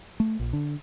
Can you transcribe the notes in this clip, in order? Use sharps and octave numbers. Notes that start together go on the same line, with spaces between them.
A3
A#1
D3